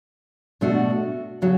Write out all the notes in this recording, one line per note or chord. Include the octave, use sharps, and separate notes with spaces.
B2 A3 D4 F#4
C#3 F#3